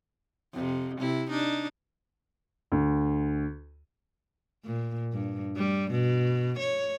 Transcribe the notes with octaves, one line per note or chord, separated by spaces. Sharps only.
F2 C3
C3 E4
D4 D#4
D2
A#2
G2
G3
B2
C#5